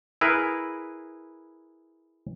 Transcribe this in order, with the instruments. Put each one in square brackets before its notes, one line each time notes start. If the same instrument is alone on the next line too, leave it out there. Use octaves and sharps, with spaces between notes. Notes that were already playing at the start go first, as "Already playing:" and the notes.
[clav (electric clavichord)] E4 G#4 A#4 B4